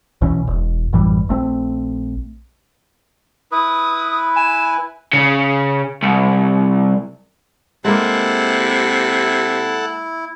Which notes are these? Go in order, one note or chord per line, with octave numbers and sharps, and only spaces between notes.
B1 B2 E3 C#4
E1
A1 F#2 E3 G3
A#1 A3 C4
E4 B4 D#6
G#5 E7
C#3
C2
C3 G#3 A#3 E4 A4 F#5